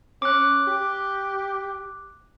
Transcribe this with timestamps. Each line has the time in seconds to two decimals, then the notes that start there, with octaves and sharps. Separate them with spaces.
0.22 C#4 D6 F#6
0.67 G4